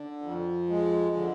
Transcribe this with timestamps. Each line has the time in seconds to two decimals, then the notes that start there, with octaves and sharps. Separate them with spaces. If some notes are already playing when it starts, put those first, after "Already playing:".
Already playing: D3
0.22 F2
0.69 G#3
1.16 D3